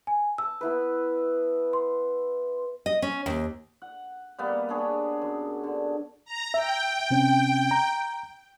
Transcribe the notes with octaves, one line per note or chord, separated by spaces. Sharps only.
G#5
A5 E6
B3 E4 B4
C6
D#5
C#4
D#2
F#5
G3 A#3 B3
B3 D4 G#4 C#5
F#2
D3
A#5
E5 G5
C3 C4 C#4
A#5